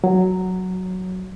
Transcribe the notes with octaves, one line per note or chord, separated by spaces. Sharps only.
F#3